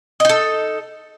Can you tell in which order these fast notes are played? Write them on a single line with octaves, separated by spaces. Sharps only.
D#5 D#4 A4